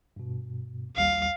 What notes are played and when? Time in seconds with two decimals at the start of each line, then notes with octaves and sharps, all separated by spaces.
0.16 G2 B2
0.96 A#1 D#2 G3 F5